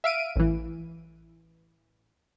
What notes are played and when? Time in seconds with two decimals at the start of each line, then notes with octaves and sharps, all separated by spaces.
0.04 E5 F5 D7 D#7
0.36 A1 E3